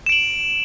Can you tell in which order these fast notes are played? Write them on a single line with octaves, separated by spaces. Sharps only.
E7 D7 F#7